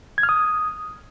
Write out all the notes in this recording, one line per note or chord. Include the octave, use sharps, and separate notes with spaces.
G#6
F6
D#6